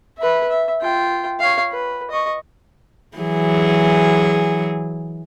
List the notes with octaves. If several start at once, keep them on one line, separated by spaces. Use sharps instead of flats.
B4 E5
E5
F4 G5
C#5 F5
B4
D#5 C#6
E3 F#3 G#4